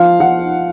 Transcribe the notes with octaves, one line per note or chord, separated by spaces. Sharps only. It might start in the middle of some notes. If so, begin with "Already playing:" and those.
Already playing: F3 F5
F3 F#5